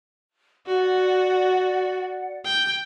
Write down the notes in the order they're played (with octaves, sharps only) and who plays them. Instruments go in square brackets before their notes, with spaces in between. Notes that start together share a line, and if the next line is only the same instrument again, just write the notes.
[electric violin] F#4 [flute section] D5 F#5
[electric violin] G5